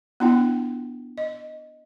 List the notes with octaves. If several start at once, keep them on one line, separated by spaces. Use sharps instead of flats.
B3 D4 E4 F4 G5
D#5